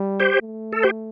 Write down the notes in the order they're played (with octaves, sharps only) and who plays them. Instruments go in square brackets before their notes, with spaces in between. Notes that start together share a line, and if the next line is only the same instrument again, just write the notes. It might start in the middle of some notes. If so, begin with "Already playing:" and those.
Already playing: [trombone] G3
[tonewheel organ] G4 C5
[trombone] A3
[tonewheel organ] A4
G4 C5